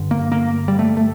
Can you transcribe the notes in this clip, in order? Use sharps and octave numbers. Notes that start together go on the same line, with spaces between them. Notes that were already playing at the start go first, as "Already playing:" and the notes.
Already playing: G2 D3
A#3
A#3
G3
A3
A3